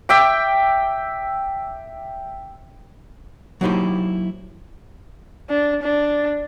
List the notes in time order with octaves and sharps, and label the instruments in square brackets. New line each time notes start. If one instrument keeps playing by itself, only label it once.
[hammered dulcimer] E5 G5 D6
[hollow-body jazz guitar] F#3 A#3 D#4 E4 G4 C5
[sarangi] D4
D4